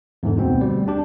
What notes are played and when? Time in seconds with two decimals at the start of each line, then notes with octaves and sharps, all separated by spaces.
0.23 E2 G#2 D3
0.36 D2 B2 B3 C4
0.61 G3
0.88 D4 G4